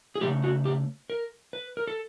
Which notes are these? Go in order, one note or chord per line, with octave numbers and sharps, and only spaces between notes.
G#4
C#3 E3 A3 G4
F#4
G4
A#4
B4
A#4
A4